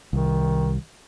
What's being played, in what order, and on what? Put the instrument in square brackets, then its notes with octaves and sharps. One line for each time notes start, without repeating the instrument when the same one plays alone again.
[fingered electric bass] C2 [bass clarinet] D#3